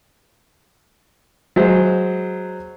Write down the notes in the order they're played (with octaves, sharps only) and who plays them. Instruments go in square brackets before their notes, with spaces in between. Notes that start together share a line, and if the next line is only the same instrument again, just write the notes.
[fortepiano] F#3 G#3 C5